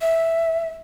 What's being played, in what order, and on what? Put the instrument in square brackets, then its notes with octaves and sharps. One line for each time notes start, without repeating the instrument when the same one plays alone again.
[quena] E5